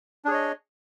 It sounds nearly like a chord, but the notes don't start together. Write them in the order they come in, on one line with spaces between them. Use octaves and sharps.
D4 G#4 C#5 D#5